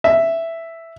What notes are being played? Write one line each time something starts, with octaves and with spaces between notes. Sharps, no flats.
E5